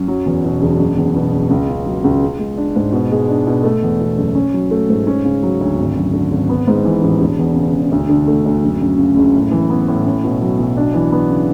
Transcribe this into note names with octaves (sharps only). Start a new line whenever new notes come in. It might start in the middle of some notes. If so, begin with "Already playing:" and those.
Already playing: F#2
F#3
E2
B2
E1
F#1
E2
B2
F#1
C#2
C#3
F#3
C#2
G#4
G#3
D4
G#2
B2
G#3
D4
B2
A3
E2
B2
F#1
C#4
F#3
A3
G#2
C#4
C#3
F#3
D2
G#1
F#2
D3
G#1
B3
G#2
E3
A1
E1
E2
C#3
E1
D2
D3
A3
D2
F#1
F#2
C#3
F#1
A2
E3
B3
A2
C#4
B2
F#3
B1
D4
E3
B3
C#3